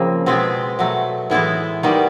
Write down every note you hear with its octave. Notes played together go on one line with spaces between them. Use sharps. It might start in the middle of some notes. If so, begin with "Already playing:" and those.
Already playing: C#3 F3 A#3 C4
B2 G#3 B3 C4
B2 F#3 A3
A2 E3 G#3 B3 E4
D#3 G3 B3 F#4